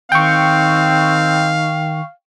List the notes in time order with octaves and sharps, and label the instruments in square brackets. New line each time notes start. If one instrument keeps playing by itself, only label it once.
[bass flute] D#3 [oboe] C4 [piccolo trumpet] F5 [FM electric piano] G5 C#6